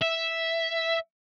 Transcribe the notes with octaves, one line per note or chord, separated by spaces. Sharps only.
E5